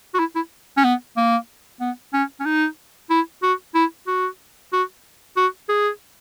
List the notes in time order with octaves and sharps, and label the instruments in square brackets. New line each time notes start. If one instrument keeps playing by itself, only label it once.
[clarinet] F#4
E4
E4
C#4
B3
A#3
B3
C#4
C#4
D#4
E4
F#4
E4
F#4
F#4
F#4
G#4